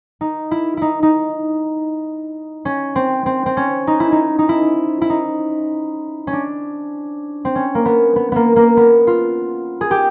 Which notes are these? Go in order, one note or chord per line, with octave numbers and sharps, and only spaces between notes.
D#4
E4
D#4 E4
D#4
C#4
C4
C4
C4
C#4
D#4
E4
D#4
D#4
E4
E4
D#4
C#4
D4
C4
C#4
A#3
B3
B3
A#3 B3
A#3
B3
F4
G#4
G4